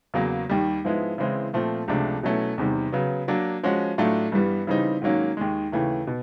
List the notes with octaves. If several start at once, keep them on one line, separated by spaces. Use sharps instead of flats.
E2 C#3 F#3 A#3
D#2 D#3 G3
G#2 F3 G#3 B3 E4
C#3 E3 G#3 C4 E4
A#2 F3 A3 C4 F4
C#2 C3 F3 A3 D4
B2 F#3 A3 C#4 E4
E2 C3 D#3 G3
C#3 F#3 B3
F#3 A#3 D4
F3 G#3 C#4 F#4
A2 F#3 A3 D4 F4
G2 E3 G3 B3
C#3 E3 G3 C4 D#4
G#2 D#3 F#3 A#3 C#4
D#2 D#3 G#3
D#2 C#3 E3 A3
B2